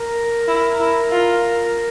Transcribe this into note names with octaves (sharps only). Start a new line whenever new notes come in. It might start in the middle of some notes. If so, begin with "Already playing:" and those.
Already playing: A#4
E4
E4
F4